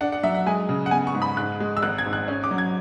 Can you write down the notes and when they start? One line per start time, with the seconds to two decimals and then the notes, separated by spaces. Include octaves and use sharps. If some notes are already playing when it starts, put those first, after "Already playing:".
0.01 D4 F#5
0.12 F#5
0.23 F#3 E5
0.34 F#5
0.46 G#3 G#5
0.69 C#3
0.86 F#5
0.91 B3 G#5
1.07 C#6
1.15 G#2
1.22 B5
1.37 G#2 F#6
1.60 G#3
1.77 E6
1.83 G#1 F#6
1.98 G#6
2.06 G#2
2.13 F#6
2.28 C#4
2.44 D6
2.51 F#3
2.58 G#6